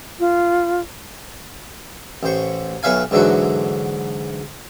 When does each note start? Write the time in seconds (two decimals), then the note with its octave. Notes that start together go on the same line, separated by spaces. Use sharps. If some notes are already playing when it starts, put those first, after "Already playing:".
0.20 F4
2.23 A1 C5 C#6
2.83 B1 B4 C#5 E5 F5 G#5
3.11 G#2 D3 E3 F#3 F#4